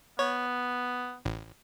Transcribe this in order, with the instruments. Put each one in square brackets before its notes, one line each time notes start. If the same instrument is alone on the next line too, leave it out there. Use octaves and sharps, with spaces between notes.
[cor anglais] B3 [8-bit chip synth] C#5
[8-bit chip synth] A1